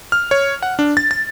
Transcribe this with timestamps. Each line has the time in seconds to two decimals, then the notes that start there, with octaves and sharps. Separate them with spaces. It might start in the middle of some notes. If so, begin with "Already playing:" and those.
0.12 F6
0.31 C#5
0.63 F#5
0.79 D4
0.97 A6
1.11 A6